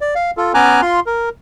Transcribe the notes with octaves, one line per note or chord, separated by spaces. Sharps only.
D5
F5
F4 A4
B3 C#4 G#5 A#5 D6 F#6
F4 C6
A#4